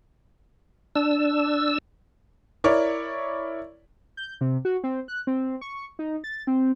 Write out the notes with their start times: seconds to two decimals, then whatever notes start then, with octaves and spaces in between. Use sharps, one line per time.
0.96 D4 E6
2.64 E4 A#4 C#5 D5 C#6
4.17 G6
4.41 C3
4.65 F#4
4.84 C4
5.08 F#6
5.27 C4
5.61 C#6
5.99 D#4
6.24 A6
6.47 C4